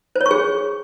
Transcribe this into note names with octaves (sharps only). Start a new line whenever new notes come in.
C5
C#5
C#6
G#4